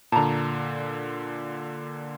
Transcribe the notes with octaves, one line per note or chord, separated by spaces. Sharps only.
A#2 D3 A5 A#5